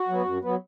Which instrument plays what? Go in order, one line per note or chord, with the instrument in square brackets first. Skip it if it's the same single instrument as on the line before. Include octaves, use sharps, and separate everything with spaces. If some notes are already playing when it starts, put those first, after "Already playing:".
Already playing: [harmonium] F#4
F#3 B3
F#2
F#3 B3